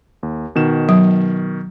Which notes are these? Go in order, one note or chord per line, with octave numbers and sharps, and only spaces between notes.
D#2
B2 D#3 E7
F#3